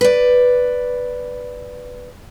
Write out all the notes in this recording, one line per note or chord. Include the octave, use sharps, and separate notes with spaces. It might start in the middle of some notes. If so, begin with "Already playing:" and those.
B4 D5